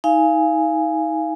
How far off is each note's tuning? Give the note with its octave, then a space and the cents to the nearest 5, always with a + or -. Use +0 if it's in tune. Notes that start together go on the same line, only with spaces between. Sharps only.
D#4 +35 F5 -20 G#5 +0